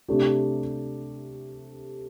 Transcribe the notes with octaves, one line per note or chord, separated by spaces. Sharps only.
C3 A3 D4 G4